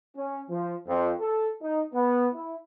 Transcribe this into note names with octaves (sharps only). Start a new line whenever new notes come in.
C#4
F3
F2
A4
D#4
B3
E4